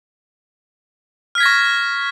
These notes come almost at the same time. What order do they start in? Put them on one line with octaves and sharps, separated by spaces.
F6 B6 G#6 A#6 C#6